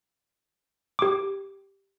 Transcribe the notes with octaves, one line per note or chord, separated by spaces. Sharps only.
G4 D6